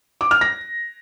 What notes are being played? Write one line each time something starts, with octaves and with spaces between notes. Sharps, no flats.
D6
F6
A#6